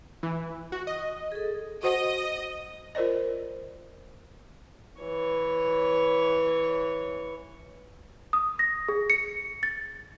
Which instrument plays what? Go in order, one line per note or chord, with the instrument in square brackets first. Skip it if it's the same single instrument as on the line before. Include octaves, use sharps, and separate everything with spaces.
[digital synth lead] E3
F#4
D#5
[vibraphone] G#4 A4
[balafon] F#4 C5 F#5 [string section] D#5
[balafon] F4 A#4 C5 D5 D#5
[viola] E3 C#5
[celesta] D#6
A#6
G#4
C#7
A6